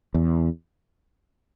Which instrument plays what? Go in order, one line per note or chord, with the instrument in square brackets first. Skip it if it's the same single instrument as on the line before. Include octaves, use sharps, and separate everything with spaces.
[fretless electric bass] E2